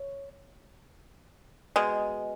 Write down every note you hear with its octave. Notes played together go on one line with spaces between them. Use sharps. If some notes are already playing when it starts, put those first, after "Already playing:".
Already playing: C#5
B2 G#3